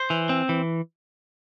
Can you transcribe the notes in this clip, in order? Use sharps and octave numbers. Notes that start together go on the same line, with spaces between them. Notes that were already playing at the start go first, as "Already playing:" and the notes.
Already playing: C5
E3
C4
E3